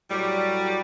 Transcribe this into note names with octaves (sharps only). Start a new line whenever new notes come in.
A2 F#3 G3